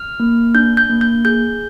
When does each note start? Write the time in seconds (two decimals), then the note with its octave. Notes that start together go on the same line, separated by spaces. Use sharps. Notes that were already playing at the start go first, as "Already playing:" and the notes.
Already playing: F6
0.20 A#3
0.55 D4 G6
0.77 G6
0.90 A#3
1.01 G6
1.25 G#4 G6